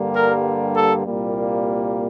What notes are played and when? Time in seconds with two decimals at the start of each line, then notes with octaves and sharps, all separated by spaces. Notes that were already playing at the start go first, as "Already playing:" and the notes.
Already playing: G2 D3 G3 A#3
0.15 A#4
0.75 A4
1.06 C2 A#2 G3 A#3